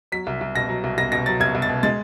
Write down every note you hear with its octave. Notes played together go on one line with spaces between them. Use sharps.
F#3 B6
C2
C2
B2 A#6
F#3
C2
C2 A#6
B2 A#6
F#3 A6
C2 G#6
C2
A6
B2
G#3 A6